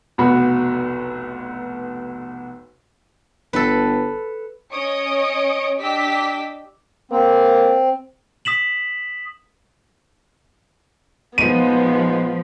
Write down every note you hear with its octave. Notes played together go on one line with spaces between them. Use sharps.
F1 B1 B3 F#4 B5
G1 A4 B4
C#4 C#5 D#5 D#6 C#7 D7
D4 G4 D#5 D6 E6 B6
A#3 C4
D#6 B6 E7 F#7
A#2 F3 G#3 B3 D#4 D#7